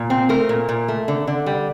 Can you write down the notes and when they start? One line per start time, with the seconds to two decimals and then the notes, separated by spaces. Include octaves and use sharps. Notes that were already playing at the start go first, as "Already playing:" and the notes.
Already playing: A#2
0.10 C4
0.29 A3 A#4
0.49 A#2
0.69 A#2
0.88 A3
1.08 D3
1.27 D3
1.46 G3